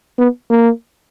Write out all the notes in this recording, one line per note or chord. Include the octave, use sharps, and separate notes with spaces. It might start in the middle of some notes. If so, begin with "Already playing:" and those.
B3
A#3